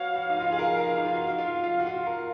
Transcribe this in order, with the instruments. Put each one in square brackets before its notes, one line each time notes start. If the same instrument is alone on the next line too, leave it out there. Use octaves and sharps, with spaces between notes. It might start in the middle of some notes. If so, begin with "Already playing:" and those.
Already playing: [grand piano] F#4 B4 C#5 [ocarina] F5
[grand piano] F#4
D#4
F4
G#4
A#4
A#4
D#4
F4
F#4
F4
F4
F#4
F4
A#4